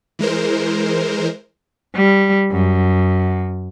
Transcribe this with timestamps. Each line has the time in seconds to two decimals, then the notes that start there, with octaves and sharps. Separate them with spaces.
0.19 E3 G#3 A#4 C5
1.95 G3
2.51 F#2